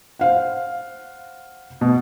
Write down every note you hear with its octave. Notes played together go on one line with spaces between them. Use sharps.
C5 F5 F#5
B2